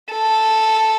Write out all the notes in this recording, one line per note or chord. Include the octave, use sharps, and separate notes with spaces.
A4